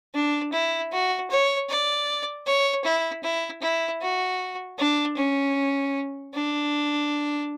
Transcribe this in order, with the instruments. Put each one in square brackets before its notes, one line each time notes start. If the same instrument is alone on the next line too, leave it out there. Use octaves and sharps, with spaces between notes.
[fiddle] D4
E4
F#4
C#5
D5
C#5
E4
E4
E4
F#4
D4
C#4
D4